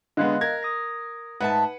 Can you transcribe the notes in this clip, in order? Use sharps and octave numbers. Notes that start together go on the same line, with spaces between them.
D3 G#3 B3 D#5 F5 F#6
A#4 G#6 A#6
D#6 A#6
G#2 B4 E5 F#5 A5